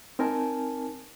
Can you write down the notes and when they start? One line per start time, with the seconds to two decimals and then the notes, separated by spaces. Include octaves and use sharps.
0.19 C4 D#4 A#4 G#5 A5